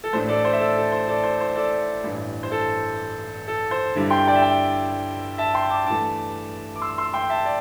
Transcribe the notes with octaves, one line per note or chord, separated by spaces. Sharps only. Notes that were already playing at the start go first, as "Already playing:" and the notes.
A4
A1 A2 A3 D4 C5
A4 D5
C5
E5
A4 D5
A4
C5
A4 D5
C5
C5
A4 D5
A1 G2 E3
C5
A4
A4
C5
G2 D3 G3 E4
G5 C6
D5 G5
E5
D5 G5
E5 A5
G5 C6
A5 D6
G2 E3 A3 A5 D6
D6
C6 E6
C6 E6
G5 C6
E5 A5
D5